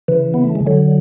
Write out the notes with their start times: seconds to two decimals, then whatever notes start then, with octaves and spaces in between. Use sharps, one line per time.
0.08 C#3 E3
0.34 B3
0.44 A3
0.55 G#3
0.67 D3 F#3